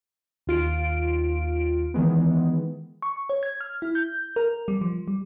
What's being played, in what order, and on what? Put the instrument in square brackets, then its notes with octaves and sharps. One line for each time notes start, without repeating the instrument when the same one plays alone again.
[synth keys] D#2 F4 D7
D#3 E3 G#3 B3
[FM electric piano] C#6
C#5
G#6
F6
E4
G6
A#4
G3
F3
G3